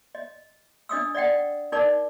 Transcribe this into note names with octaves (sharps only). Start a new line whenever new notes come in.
D#5
D4 D#5 D#6 E6
D5 D#5 F#5 G5
D#4 A#4 D5 A5 D6